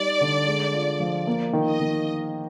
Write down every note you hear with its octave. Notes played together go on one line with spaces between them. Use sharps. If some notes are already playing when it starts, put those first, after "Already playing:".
Already playing: G3 D#4 D5
D3
G#3
F4
F3
A#3
D#3
D#5
D#3